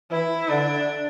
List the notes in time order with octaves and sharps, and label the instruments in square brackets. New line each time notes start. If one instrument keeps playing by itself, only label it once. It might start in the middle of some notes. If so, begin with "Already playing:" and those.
[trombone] E3 [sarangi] E4
[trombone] D3 [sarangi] D4